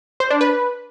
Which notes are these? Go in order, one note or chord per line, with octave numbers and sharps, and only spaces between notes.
C5
D4
B4